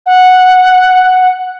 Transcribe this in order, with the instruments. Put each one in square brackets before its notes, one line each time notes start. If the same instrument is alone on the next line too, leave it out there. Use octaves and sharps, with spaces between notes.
[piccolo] F#5